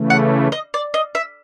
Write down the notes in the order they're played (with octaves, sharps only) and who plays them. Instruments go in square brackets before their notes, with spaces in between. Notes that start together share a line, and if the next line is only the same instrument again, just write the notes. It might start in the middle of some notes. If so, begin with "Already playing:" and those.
Already playing: [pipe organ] C#3 E3 A3
[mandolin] F#5
D#5
D5
D#5
E5